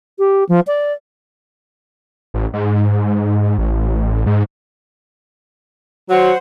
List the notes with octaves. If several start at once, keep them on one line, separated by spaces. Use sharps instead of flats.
G4
F3
D5
A1
G#2
A1
G#2
F#3 C5 F#5